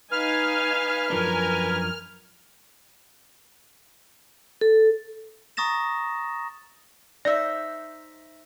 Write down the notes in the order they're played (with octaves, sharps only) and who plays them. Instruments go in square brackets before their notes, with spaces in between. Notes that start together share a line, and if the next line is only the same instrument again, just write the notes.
[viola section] D#4 F5 G#5 [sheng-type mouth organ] B4 [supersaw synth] F6
[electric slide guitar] F#2 F3 D4 [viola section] A#4 G#5
[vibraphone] A4
[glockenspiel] A#5 C#6 D#6 A6 A#6 E7
[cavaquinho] D#4 C5 E5 [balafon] D5